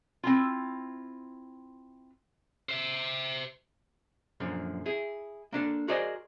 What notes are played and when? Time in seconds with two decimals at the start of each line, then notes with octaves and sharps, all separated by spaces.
0.23 C4 E4 F4
2.69 C5 E5
4.40 F#2 A#2 D3 F3
4.86 E4 G#4
5.53 A#3 D4 A4
5.88 F#4 G#4 A#4 C5 D5 D#5